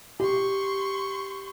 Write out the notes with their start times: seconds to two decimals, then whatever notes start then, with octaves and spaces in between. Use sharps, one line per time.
0.20 G4 C6 C#6